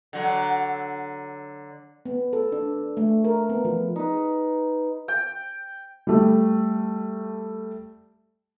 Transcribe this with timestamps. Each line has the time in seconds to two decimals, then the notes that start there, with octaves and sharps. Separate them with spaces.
0.13 D3 F#3
2.06 B3
2.33 A4
2.52 D4
2.97 A3
3.24 A#4
3.49 B3
3.65 F3
3.96 D#4 B4
5.08 G5
6.07 G3 A3